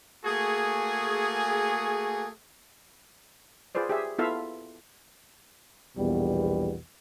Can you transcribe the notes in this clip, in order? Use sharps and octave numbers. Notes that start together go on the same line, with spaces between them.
A3 A#3 F#4 G#4
F4 G#4 B4 C5 D5
G4 G#4 E5
B3 E4 F4 A4 E5 F5
A#1 E2 B2 G3